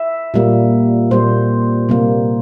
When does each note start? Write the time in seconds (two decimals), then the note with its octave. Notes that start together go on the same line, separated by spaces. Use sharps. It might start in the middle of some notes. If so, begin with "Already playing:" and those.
Already playing: E5
0.34 A#2 G3 A#3
1.11 A#2 G3 A#3 C5
1.89 C3 G3 A#3